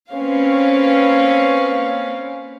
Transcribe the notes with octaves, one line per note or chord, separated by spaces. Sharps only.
A#3 C4 C#4 B4 C#5 F5